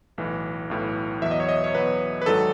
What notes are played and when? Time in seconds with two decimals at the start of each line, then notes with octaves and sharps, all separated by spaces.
0.18 B1 A2 E3
0.70 B1 A2 E3
1.22 E2 B2 F#3 E5
1.31 D#5
1.40 C#5
1.49 D#5
1.64 C#5
1.74 E2 B2 F#3 B4
2.22 B4
2.26 G#1 G#2 F#3 A4